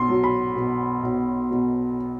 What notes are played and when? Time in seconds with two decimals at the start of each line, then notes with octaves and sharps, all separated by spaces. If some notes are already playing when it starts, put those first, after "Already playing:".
Already playing: B1 C6
0.09 F#3
0.24 B5
0.56 B2
1.03 B1
1.51 B2